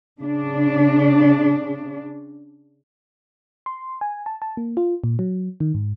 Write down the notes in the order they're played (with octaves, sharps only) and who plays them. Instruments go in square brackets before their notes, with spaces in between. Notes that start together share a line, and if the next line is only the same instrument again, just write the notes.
[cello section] C#3 D4
[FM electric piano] C6
G#5
A5
A5
A#3
F4
A#2
F#3
D#3
G#2